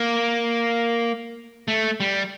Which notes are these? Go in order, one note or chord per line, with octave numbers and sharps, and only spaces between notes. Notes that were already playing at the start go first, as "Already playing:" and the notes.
Already playing: A#3
A3
G3